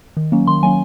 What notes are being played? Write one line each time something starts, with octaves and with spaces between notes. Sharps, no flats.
D#3
F#3 A#3 C#4
D#3 C6
F#3 A#3 C#4 G#5